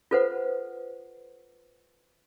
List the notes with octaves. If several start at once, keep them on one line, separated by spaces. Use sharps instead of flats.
F4 A4 B4 C5 F#5